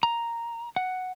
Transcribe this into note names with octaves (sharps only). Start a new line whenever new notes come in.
A#5
F#5